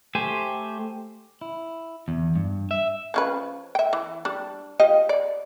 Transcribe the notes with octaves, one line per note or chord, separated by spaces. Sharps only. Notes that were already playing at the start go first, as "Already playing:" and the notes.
A3 G4 C5 G#5
E4
E2
G2
E5
F3 C#4 B4
E5 G5
E3
G3 D4
F4 G4 D#5
D5